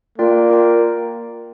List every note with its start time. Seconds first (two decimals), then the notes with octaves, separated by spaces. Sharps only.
0.18 A#3 F4 A#4 D5 G5
0.50 F4 A#4 D5 G5